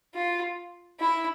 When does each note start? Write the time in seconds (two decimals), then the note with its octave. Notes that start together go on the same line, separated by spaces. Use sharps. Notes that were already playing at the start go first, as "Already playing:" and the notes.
0.15 F4
1.00 E4